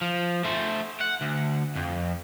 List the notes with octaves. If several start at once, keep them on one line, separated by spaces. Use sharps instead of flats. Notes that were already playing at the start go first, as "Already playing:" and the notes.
F3
A3 C5
F#5
D2
F2